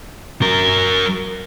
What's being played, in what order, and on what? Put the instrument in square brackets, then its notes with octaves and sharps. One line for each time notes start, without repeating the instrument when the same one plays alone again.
[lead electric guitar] F#3 A#4